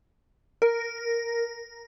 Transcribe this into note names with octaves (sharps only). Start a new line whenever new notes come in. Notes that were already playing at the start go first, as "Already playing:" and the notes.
A#4